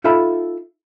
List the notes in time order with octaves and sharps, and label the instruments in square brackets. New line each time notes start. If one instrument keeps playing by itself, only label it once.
[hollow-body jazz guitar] D#4 F4 A4 E5 B5